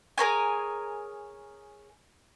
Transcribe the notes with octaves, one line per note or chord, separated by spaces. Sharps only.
G#4 A#4 C#5 G#5